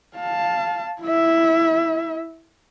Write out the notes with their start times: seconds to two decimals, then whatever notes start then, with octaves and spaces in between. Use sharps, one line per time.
0.17 F5 A5
1.02 E4 E5